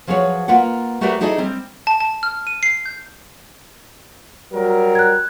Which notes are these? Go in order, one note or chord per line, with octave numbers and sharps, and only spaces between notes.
F3 F#3 G#4 B4 C#5
A#3 F4 B4 F#5
A3 F#4 G4 A#4 B4 D5
D#4 E4 G#4 A4 D5 D#5
G3 C4
A5
A5
F6
D#7
C7
G6
F#3 G3 A#4
F#6 G#6